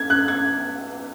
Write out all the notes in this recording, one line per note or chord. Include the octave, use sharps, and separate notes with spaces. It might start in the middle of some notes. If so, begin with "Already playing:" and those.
Already playing: G#6
F#6
G#6